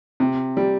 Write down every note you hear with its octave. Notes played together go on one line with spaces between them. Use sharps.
C3
G3